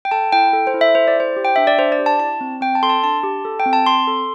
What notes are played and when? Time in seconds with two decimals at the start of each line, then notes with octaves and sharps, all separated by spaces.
0.05 G5
0.11 A4 A5
0.32 E4 G5
0.53 A4
0.67 C5
0.74 E4
0.81 E5
0.95 A4 C5
1.08 D5
1.16 E4 C5
1.36 G4
1.45 G5
1.56 D4 E5
1.67 D5
1.78 D4 C5
1.92 D5
1.99 G4
2.06 A5
2.19 E4 A5
2.41 C4
2.61 C4 G5
2.75 A5
2.82 A4 C6
2.89 A5
3.03 D4 A5
3.23 G4
3.45 A4
3.60 G5
3.66 C4
3.73 A5
3.86 C4 C6
4.07 A4